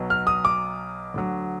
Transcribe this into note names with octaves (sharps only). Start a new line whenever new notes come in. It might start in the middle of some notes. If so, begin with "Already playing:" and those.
Already playing: B1 B2 F#3
F6
D#6
D6
D2 D3 F#3